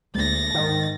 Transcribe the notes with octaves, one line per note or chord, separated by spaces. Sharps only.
D2 G#3 A#3 A6 A#6
G#2 D#3